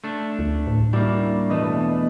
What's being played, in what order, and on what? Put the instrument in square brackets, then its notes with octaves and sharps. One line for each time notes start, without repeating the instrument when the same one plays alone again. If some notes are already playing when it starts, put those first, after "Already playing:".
[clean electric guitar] A3 D4
[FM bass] D2
A2
[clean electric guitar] G3 A#3 [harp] D4 E4 F#4
[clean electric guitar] E2 B2 A3 [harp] B4 D#5